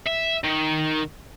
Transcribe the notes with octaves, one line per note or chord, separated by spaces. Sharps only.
E5
D#3